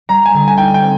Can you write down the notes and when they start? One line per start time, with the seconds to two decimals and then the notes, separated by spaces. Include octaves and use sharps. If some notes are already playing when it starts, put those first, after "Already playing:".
0.09 G3 A#5
0.26 G#5
0.34 D3
0.48 G#5
0.58 D#4 G5
0.74 G5
0.82 C4